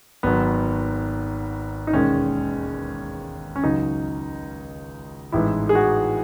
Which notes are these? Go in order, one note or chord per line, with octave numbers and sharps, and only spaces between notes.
G#1 G#2 F#3 B3
D#4
E1 D#2 D#3 G#3 C#4
C#4
C#2 C#3 F#3 D#4
A1 G#2 E3 G#3 E4
G#4
F#4